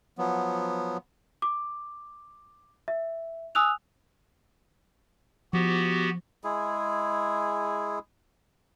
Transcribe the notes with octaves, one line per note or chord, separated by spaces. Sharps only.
F3 F#3 B3
D6
E5
G#5 D#6 E6 F#6 F7
F3 B3 F#4 G4
G#3 E4 G#4